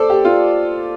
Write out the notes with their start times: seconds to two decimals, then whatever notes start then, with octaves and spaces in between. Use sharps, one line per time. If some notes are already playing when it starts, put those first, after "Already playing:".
Already playing: A4 C5 D5
0.10 G4
0.25 F4